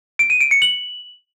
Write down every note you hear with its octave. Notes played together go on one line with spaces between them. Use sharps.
D7
D#7
D7
C#7
F#7